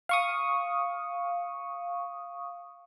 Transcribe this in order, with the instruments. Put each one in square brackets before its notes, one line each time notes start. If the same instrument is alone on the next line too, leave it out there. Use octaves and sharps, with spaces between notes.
[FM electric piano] F5 C#6 D#6